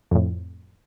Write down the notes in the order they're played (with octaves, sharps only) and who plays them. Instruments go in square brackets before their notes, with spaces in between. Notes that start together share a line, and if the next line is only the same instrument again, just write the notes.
[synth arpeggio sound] F2 A2